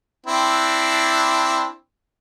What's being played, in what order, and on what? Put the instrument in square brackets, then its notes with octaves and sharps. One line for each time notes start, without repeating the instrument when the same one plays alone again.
[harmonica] C4 D4 E4